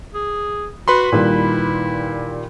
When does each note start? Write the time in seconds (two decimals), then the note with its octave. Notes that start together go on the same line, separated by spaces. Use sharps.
0.14 G#4
0.88 F#4 B4 B5 C6
1.12 A#2 D#3 G3 E4